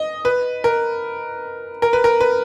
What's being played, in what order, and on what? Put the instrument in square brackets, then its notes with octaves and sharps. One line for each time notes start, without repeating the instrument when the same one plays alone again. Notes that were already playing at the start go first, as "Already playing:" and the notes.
Already playing: [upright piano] D#5
B4
A#4
A#4
B4
A#4
B4